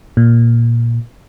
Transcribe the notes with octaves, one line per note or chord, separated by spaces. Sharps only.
A#2